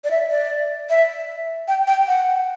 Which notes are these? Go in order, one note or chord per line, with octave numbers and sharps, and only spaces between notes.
D5
E5
D5
E5
G5
G5
F#5